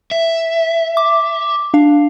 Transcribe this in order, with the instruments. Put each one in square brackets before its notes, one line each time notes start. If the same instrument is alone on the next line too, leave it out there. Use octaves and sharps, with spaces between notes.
[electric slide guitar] E5
[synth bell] D6
D4 F5